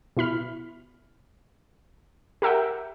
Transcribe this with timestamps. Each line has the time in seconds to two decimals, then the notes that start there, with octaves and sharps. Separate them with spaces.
0.17 B2 E4 B5 F6
2.42 G4 A#4 E5 F#5 G5